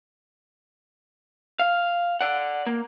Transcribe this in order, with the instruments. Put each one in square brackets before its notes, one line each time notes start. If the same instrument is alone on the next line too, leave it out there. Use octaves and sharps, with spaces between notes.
[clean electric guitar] F5
D5 F#5
A#3